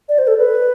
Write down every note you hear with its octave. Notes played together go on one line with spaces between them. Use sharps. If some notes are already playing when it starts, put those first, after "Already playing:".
D5
C5
A4
B4